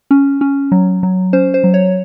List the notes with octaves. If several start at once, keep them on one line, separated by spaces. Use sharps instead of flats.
C#4
C#4
F#3
F#3
C#4 C5
C5
F#3
C#5